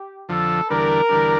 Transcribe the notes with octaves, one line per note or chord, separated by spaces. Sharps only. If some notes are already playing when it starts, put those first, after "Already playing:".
Already playing: G4
F2 D3 F3 A4
E2 D3 G3 D4 A#4
E2 D3 G3 D4